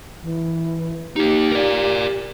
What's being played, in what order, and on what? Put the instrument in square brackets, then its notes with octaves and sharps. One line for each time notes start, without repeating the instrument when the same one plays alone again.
[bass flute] E3
[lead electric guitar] A#3 D#4 [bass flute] G4
[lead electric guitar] A#4 D5